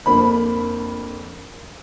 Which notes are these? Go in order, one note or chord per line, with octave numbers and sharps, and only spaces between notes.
F2 A#3 D4 C5 B5